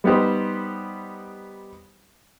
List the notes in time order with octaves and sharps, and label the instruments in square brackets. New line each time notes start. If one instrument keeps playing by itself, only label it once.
[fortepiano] G3 B3 D#4 G4 C5